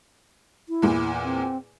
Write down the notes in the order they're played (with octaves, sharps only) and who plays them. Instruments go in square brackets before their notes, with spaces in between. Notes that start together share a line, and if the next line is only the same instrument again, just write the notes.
[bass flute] E4
[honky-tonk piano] E2 A#2
[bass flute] C4